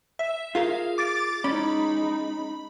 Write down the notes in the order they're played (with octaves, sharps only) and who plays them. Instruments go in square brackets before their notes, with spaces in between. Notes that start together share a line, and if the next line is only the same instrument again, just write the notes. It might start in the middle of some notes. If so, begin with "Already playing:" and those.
[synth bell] E5
[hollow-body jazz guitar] F4 G#4 A#4 [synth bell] F5
[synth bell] D6 A6 D7
[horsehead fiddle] G#3 D#4 [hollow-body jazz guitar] C#4 [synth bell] B5